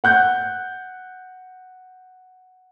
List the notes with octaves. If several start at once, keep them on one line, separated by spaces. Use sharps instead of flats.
F#5 F#6 G6